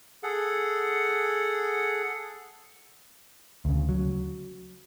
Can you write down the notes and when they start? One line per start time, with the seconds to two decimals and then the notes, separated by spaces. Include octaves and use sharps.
0.23 G#4 A4 F#5
3.65 D2 C#3
3.89 F#3